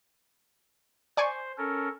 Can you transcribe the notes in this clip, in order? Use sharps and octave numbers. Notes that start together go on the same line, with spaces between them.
C5 D5 G#5 C#6
C#4 A4 A#4